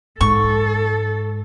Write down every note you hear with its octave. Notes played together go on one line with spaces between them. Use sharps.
G#2 A4 C#6